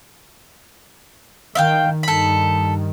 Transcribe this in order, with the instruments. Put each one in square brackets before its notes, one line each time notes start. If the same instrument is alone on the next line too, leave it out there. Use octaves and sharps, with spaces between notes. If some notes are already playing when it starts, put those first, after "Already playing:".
[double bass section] D#3 [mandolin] E5 F5 G5
[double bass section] G2 D#3 [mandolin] A4 B5